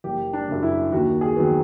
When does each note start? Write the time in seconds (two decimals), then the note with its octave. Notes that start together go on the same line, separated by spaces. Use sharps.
0.04 F#1 G4
0.33 D4
0.48 F#2 C#3
0.63 E4
0.92 D#2 F#4
1.21 G#4
1.36 D#3 F#3 B3